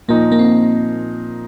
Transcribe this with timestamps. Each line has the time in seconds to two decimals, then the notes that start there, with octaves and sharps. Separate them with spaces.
0.08 A#2 F3 A#3 D#4
0.32 A#3
0.39 C4